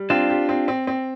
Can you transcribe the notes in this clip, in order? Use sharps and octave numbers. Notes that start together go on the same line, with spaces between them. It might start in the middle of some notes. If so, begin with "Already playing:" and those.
Already playing: G3
C4 D4 F4
G4
C4
C4
C4